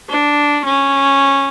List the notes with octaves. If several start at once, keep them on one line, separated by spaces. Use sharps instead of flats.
D4
C#4